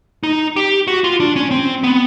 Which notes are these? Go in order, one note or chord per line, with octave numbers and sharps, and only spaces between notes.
D#4
G4
F#4
F4
D4
C#4
C4
B3